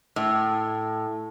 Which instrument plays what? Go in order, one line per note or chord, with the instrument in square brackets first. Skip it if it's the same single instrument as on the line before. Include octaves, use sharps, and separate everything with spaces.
[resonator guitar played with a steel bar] A2